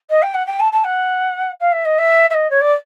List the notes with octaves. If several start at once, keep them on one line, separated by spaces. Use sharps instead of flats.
D#5
G5
F#5
G5
A5
A5
F#5
F5
E5
D#5
E5
E5
D#5
C#5
D5